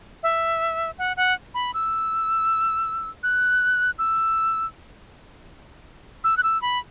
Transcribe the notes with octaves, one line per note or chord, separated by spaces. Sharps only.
E5
F#5
F#5
B5
E6
F#6
E6
E6
F#6
E6
B5